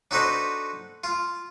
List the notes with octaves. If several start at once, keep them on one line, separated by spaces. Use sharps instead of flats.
D4 D#4 F#4 A4 B4 C5
F4